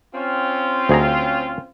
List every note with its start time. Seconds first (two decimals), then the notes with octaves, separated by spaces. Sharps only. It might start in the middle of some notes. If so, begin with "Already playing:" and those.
0.15 C4 C#4 F4
0.89 D2 G#4 A#5